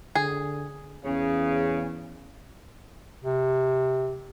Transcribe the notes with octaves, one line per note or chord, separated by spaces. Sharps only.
D3 G#4
E2 C#3 C#4
C3